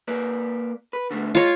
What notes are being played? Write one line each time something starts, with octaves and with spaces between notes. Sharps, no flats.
A#3 B4 D5
B4
D3 A3 B3
G#2 F4 C#5 D#5